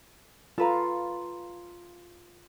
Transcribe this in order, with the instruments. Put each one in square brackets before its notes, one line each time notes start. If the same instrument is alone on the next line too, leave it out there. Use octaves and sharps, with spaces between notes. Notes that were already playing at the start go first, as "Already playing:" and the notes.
[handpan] F4 [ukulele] A4 B4 A#5